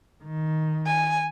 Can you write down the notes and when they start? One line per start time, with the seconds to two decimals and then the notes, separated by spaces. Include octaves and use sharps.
0.24 D#3
0.86 G#5